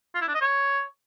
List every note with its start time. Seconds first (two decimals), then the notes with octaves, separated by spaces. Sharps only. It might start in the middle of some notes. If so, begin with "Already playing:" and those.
0.15 F4
0.21 E4
0.28 D4
0.35 D#5
0.41 C#5